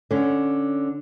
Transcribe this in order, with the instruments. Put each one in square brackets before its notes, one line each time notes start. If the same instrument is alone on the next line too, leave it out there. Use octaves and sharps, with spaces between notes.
[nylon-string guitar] D3 C#4